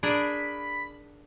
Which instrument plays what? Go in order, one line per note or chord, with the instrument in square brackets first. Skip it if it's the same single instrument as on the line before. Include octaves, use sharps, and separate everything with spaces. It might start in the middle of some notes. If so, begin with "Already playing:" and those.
[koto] D4 G#4 A#4 [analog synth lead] B5